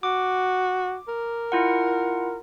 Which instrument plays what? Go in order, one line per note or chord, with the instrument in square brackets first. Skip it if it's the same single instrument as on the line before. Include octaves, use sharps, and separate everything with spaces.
[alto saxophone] F#4 [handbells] D6
[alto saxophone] A#4
[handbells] E4 F4 F#5